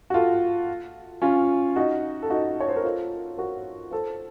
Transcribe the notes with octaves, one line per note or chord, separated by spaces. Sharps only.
F#4
F4 A4
C#4 F4
D#4 F#4
A4
D#4 F#4
C#5
C5
A#4
F4 A4
F#4 A#4
A4 C5